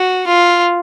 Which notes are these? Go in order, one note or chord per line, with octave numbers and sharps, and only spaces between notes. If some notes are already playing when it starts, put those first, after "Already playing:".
Already playing: F#4
F4